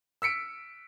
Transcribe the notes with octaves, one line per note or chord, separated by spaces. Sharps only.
E6 B6 C#7 D7